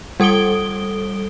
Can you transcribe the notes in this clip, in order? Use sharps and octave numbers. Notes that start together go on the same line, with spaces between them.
G3 A4 D#6 D7 G7